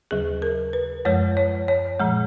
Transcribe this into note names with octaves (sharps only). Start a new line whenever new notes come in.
D#2 C#3 F#3 G#4
A#4
B4
F#2 F3 G#3 C#5
C#5
C#5
A#2 F3 G#3